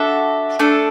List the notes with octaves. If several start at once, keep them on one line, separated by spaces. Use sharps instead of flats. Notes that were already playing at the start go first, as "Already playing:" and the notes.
Already playing: D4 F#4 A4 E5
A3 D4 A4